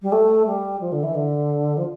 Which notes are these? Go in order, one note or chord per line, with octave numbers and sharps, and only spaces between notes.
G3
A3
G3
F3
D3
E3
D3
F3